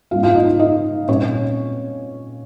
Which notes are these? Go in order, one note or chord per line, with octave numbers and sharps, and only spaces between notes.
G#2 G3 A#3 C#4 F4 F5
F4 F5
D#4 D#5
D#4 D#5
A#2 G3 C4 C#4 C#5